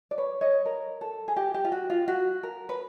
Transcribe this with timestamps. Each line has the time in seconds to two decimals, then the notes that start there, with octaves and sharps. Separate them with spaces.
0.11 D5
0.18 B4 C#5
0.41 C#5 D#5
0.66 A#4
1.01 A4
1.28 G#4
1.36 G4
1.54 G4
1.65 F4
1.72 F#4
1.90 F4
2.08 F#4
2.43 A#4
2.69 B4